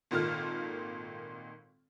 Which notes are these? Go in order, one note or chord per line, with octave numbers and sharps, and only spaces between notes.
G#1 A#2 D#3 A4 F6